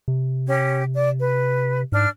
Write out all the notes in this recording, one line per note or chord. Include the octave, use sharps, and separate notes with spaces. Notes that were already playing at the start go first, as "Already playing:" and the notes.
C3
C#4 G4
D5
B4
G#2 D4 F6